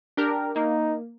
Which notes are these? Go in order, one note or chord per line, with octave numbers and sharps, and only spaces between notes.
D4 G4 A#4
A#3 D#4